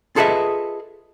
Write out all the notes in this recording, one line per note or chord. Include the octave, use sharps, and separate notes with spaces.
F4 G#4 A4 B4 D#5 E5